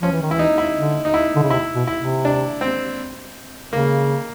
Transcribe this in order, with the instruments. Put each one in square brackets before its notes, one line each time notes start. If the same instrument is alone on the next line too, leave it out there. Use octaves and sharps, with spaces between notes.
[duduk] F3 [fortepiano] C#4
[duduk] E3
D#3
[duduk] E3 [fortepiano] E4
[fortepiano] D#4
E4
[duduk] D3
[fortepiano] D#4
E4
[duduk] D3
C#3
[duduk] C3 [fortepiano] E4
[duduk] B2
[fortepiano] E4
[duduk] C3
[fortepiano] D4
C4
[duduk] C#3 [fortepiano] A#3